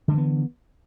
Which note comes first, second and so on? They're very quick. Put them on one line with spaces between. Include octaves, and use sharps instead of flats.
D3 G#3 E3 B3